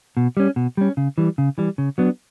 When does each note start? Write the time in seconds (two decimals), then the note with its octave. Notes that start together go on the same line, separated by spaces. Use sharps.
0.17 B2
0.37 G3 C#4
0.56 B2
0.77 G3 C#4
0.97 C#3
1.18 E3 G3
1.38 C#3
1.58 E3 G3
1.78 C#3
1.98 F#3 B3 D4